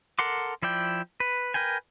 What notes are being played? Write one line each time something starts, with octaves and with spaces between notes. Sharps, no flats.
A4 A#4 F#5 C6 D6
F3 E4 D5 G5
B4
A#4 B4 G5 G#5